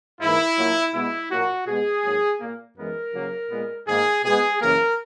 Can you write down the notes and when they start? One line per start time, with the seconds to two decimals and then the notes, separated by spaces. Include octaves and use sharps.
0.21 G#2 E3 A#3 E4
0.57 A#2 F#3 A#3
0.94 B2 G#3 B3 E4
1.31 A#2 F#3 A#3 F#4
1.67 B2 G#3 B3 G#4
2.04 G#2 F#3 A#3
2.40 A#2 A#3
2.77 F#2 E3 G#3 B3 A#4
3.14 C#3 F#3 A#3
3.51 A#2 G#3 B3
3.87 G#2 D#3 A#3 G#4
4.24 B2 G#3 B3 G#4
4.60 F#2 C#3 E3 A#3 A#4